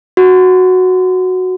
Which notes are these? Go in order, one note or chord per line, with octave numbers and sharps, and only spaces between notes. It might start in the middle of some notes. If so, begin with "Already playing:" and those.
F#4